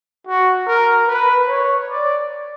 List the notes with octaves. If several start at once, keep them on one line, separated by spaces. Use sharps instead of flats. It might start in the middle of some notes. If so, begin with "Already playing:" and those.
F#4
A#4
B4
C#5
D5